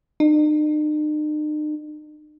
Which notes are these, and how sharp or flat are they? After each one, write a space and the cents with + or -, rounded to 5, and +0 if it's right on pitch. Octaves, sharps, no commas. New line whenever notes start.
D#4 -45